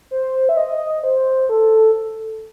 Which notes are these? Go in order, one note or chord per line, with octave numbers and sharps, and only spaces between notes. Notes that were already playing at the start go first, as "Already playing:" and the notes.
C5
E5
D#5
C5
A4